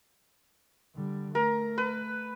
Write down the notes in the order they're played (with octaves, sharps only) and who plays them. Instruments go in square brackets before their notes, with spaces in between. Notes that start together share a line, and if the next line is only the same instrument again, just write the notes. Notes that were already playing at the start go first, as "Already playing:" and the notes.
[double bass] D3 G3
[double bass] A3 [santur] A#4
[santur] B4